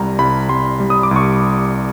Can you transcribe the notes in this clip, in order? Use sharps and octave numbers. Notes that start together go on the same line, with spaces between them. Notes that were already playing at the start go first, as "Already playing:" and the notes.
Already playing: C2 G3 A#5
C2 B5
C2 C6
G3
D#6
D6
C2
C#6